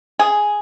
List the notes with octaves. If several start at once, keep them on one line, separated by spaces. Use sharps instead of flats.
G#4